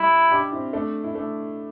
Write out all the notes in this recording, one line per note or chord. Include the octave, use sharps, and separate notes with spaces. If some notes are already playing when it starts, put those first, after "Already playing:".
Already playing: G3 E4
D4 G4
C4 E4
A3 D4
E4
A3 D4